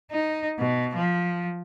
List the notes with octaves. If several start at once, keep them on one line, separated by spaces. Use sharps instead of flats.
D#4
B2
F3